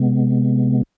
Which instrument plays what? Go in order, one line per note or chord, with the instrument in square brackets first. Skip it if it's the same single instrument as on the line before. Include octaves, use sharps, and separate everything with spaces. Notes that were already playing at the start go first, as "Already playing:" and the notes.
Already playing: [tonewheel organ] C3 G#3 B3